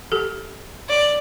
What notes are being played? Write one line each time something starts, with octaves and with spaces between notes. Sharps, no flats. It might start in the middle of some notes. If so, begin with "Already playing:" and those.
G4 A4
D5